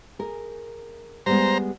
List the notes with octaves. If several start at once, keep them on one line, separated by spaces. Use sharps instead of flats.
G#4 A#4
G3 G#3 B3 C5 A#5